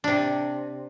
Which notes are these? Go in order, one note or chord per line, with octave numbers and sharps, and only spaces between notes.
C3 D4